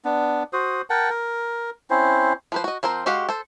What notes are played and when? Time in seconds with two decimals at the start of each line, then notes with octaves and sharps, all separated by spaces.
0.05 B3 D4
0.53 F#4 C5 D#6
0.90 A#4 F#5 G5 A5
1.10 A#4
1.90 C4 C#4 E4 C5
2.52 F3 B4 C5
2.64 F#4 D#5
2.83 F3 C4 A#4 C5
3.06 G#3 F#4 G4 F5 F#5
3.29 A4 C5